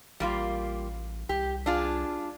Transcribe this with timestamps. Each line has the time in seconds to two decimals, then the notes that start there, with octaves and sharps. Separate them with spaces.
0.20 A1 G3 A#3 F4
1.29 C2 G4
1.66 D4 F4 G#4